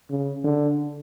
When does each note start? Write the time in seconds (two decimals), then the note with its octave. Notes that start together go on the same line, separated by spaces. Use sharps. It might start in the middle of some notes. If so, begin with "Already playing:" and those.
0.10 C#3
0.44 D3